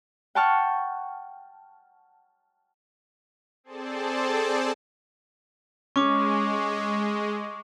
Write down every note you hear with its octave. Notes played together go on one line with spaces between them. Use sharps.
F#5 G5 A5 C#6 F6
C4 G#4 A4 C5 D5 A5
G#3 C#4 C#6 D6